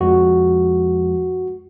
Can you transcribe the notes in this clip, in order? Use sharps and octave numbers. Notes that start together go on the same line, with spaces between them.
F2 F3 G#3 F#4